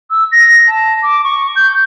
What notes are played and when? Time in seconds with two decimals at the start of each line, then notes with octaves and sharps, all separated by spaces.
0.11 E6
0.32 A#6
0.68 A5
1.03 D6
1.24 C#6
1.56 G6